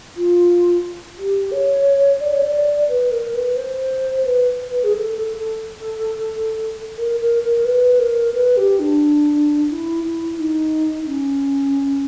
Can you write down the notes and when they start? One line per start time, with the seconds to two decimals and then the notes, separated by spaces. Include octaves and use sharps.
0.16 F4
1.18 G4
1.52 C#5
2.20 D5
2.32 C#5
2.43 D5
2.89 B4
3.11 A#4
3.34 B4
3.56 C5
4.25 B4
4.70 B4
4.84 G#4
4.93 A4
5.16 A4
5.38 A4
6.97 A#4
7.20 A#4
7.43 A#4
7.65 B4
7.99 A#4
8.34 B4
8.57 G4
8.79 D4
9.70 E4
10.04 E4
10.38 D#4
11.07 C#4